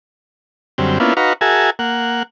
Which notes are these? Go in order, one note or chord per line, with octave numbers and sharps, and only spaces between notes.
F#2 D3 G3 C4
A#3 B3 C#4 D4 E4 F4
D#4 F#4 B4 F5 A#5 C#6
F#4 G#4 A#4 E5 G#5 A5
A#3 F#5